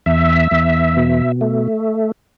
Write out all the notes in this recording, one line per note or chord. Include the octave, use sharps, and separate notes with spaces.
E2 E5
E2
B2
A3